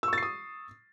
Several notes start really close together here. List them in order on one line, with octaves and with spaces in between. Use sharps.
E6 C#6 A6 C7 D#6